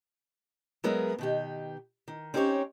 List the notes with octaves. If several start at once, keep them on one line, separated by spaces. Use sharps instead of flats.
F#3 G#3 B3 G#4 A#4 E5
B2 D#3 G4
D#3
C4 C#4 D#4 G4 B4 C#5